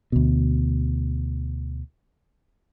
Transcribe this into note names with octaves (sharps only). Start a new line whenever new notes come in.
D2 B2